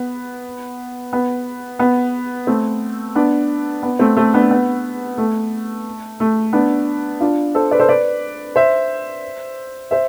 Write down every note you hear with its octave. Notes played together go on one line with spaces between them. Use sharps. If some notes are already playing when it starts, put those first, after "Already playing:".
Already playing: B3
B3
B3
A3 C4
B3 D4
B3
A3 C4
A3 C4
B3 D4
B3
A3
A3
B3 D4
D4 F4
A4 C5
B4 D5
A4 C5
B4 D5
C5 E5
C5 E5